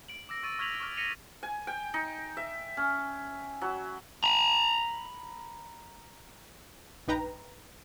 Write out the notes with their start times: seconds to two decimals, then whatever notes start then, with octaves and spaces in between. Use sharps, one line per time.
0.09 D7 F#7
0.29 D6 E6 A#6
0.43 C#6 E6 A6 D#7
0.59 C#6 F6 G#6 B6 F7 F#7
0.80 C#6 D6 F6
0.97 A#6 B6 C#7 D#7 F7
1.43 G#5
1.67 G5
1.94 D#4
2.37 E5
2.77 C#4
3.61 F#3
4.24 A#5 B5
7.08 A#1 G2 D#4 B4 G5 A#5